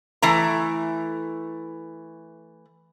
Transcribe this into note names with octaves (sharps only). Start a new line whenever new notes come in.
E3 A3 A#5